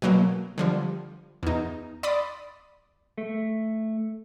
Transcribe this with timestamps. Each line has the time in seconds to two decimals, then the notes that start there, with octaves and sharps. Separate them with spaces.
0.02 B2 F#3 A#3
0.58 D3 F3 G3
1.43 E2 D#4
2.03 D5 B5 C6 D#6
3.18 A3